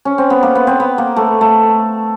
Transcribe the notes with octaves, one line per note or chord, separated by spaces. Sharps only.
C#4
C4
B3
A#3
B3
C4
B3
A#3
A3
A3